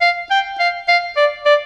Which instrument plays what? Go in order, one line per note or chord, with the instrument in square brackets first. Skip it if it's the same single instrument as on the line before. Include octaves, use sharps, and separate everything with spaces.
[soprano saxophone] F5
G5
F5
F5
D5
D5